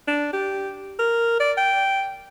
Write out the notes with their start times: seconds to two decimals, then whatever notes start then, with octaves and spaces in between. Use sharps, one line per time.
0.08 D4
0.33 G4
0.99 A#4
1.40 D5
1.58 G5